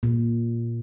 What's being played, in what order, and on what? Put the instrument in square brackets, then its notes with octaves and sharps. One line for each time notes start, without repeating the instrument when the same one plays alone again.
[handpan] A#2